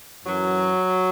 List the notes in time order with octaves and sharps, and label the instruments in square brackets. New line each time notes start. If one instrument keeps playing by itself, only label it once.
[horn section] F#2 E3 F#3